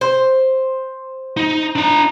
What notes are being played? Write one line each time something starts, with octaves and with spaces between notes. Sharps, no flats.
C5
D#4
D4 A#5